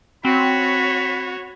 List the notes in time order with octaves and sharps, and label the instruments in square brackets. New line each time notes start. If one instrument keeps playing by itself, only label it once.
[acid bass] C4 [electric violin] F#4 C#5 [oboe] B5